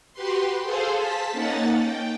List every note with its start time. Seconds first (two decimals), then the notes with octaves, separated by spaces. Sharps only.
0.13 F#4 G4 B4 C6
0.62 G#4 A4 C5 F5
0.94 A5 B6
1.32 A#3 C#4 D#4 F#5 A6
1.80 G5